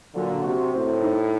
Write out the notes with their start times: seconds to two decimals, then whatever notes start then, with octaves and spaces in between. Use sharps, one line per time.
0.15 A#2 D3 F#3
0.44 C3 F#4
0.73 A2 C4
1.02 D#4